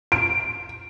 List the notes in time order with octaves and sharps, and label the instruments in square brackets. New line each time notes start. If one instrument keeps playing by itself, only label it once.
[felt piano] D7